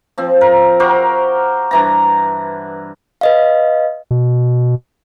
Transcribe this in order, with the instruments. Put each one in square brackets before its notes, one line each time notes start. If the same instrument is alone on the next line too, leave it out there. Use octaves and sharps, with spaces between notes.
[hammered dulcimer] F3 C4
A#4
F#4 G4 A#4 C5
G2 E3 A#5
[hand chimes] B4 D#5 F5
[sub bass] B2